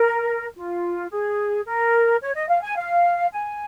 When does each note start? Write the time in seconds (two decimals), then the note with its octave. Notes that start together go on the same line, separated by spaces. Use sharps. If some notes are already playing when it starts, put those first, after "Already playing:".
Already playing: A#4
0.56 F4
1.11 G#4
1.66 A#4
2.21 C#5
2.35 D#5
2.49 F5
2.63 G#5
2.77 F5
3.33 G#5